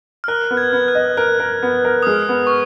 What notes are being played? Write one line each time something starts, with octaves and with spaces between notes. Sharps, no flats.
F6
A#4 F#6
B3
G#6
B3
F#6
D#5
A#4 F#6
A#4
B3
A#4
D#6
G#3 F6
B3
C#6